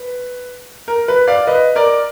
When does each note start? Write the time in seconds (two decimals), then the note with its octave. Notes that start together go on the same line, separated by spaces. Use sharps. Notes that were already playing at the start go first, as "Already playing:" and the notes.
Already playing: B4
0.88 A#4
1.08 B4
1.27 D5 F5
1.47 B4 D#5
1.75 A#4 D5